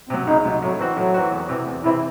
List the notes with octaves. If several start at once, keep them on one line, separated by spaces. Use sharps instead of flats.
C3 F#3 C4
C#2 D#4
C3 F#3
A2 F#3
E3 C4 F#4
A2 F#3
E3 C4 F#4
E2
C3 E3 C4
E2
C3 E3 C4 E4